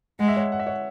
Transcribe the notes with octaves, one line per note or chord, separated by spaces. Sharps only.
G#3 F#5
E5
C#5 F#5
F#5
E5
C#5 F#5